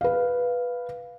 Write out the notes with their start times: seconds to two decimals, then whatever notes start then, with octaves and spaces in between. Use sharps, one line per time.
0.01 B4 F5